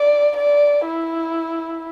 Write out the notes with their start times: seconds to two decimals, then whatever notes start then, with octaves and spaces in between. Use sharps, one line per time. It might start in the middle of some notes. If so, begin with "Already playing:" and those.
Already playing: D5
0.37 D5
0.87 E4